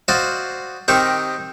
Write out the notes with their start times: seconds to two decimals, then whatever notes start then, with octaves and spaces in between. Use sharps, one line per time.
0.08 F#4 C5 D5 D#5 F5
0.88 D#3 C4 D#4 G4 A#4 C#6